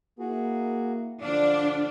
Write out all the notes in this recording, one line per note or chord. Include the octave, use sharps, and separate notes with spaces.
A#3 E4 F#4 G#4
D3 F3 D4 F5